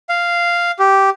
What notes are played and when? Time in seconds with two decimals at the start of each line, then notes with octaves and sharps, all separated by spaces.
0.09 F5
0.79 G4